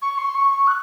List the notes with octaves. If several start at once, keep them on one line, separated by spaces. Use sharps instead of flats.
C#6
C6
C#6
C#6
F#6